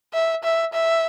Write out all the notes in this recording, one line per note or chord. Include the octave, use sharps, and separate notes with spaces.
E5
E5
E5